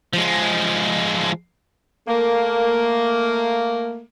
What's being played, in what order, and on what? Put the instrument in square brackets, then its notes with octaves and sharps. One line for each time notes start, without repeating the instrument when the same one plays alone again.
[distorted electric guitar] F3 G#3
[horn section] A3 A#3